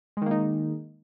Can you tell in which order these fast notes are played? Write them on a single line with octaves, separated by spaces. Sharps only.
G#3 D#3 A#3 D#4